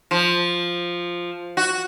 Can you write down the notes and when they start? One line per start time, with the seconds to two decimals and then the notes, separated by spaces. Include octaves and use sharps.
0.11 F3
1.57 F#4